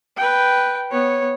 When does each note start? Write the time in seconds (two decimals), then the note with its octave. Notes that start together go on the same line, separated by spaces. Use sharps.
0.17 B4 G5
0.91 B3 C#5